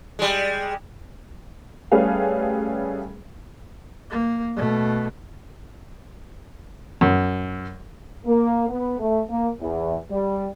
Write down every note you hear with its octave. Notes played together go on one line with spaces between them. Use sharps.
G3 G#3
G3 A3 C#4 G#4 B4 F5
A#3
B2 A3
F#2
A#3
B3
A3
A#3
E2
G3